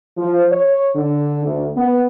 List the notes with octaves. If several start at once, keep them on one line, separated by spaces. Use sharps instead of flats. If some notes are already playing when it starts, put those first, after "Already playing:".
F3
C#5
D3
D2
B3